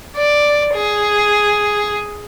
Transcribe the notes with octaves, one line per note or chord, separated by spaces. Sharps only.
D5
G#4